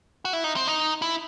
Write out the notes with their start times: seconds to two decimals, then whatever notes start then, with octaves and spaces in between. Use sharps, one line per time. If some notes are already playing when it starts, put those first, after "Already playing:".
0.25 F#4
0.33 E4
0.44 D#4
0.56 C4
0.67 D#4
1.02 E4